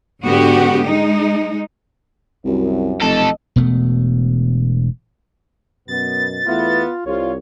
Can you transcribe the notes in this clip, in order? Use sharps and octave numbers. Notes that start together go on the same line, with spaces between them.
G#2 D3 B3 F#4 G4
G#3 D#4
C2 F#2
F1 B1 A4 D#5
E1 B2 A3
F#2 B2 B3 A6
E2 A3 B3 E4 F4
C2 F4 C#5